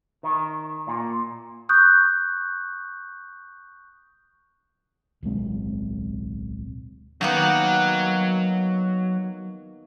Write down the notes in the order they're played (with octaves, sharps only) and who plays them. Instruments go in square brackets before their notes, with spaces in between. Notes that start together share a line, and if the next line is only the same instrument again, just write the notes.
[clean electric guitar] D#3
A#2
[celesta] C#6 D#6 F#6 G6
[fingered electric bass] D1 B1 G#3 C4
[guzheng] D#3 A#3 B3 [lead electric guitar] F#3 F#5